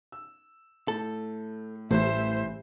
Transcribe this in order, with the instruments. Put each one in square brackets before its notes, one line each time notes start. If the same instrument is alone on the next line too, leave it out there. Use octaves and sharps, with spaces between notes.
[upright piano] E6
[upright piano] A2 [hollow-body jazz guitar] A4
[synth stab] A1 [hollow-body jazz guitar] A2 [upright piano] E3 G3 [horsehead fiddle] C5 E5